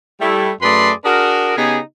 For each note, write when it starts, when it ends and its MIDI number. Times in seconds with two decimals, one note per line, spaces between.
0.20 0.50 55
0.20 0.50 57
0.20 0.50 64
0.61 0.92 42
0.61 0.92 57
0.61 0.92 68
0.61 0.92 71
0.61 0.92 74
0.61 0.92 84
1.05 1.54 62
1.05 1.54 66
1.05 1.54 68
1.05 1.54 70
1.56 1.79 49
1.56 1.79 59
1.56 1.79 63
1.56 1.79 67
1.56 1.79 68